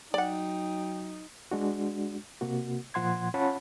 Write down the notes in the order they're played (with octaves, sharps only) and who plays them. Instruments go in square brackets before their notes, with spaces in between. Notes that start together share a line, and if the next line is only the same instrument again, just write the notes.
[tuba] F#3 [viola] D#4 [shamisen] D5 F#5 [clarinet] G5
[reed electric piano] G#3 D4 F#4
C3 A#3 F#4
A#2 F3 F#5 C6 G#6
C#4 F4 C#5 F#5 A5 B5